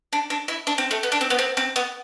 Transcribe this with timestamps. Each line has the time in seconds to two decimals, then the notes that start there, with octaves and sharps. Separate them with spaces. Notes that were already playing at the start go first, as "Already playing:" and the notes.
0.13 D4
0.30 D4
0.48 E4
0.67 D4
0.78 C4
0.91 A3
1.03 B3
1.12 D4
1.21 C4
1.30 B3
1.39 C4
1.57 C4
1.76 B3